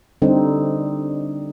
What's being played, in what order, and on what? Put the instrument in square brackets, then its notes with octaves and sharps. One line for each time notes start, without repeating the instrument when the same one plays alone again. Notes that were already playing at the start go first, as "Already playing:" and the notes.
[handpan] D3 G3 C4 D#4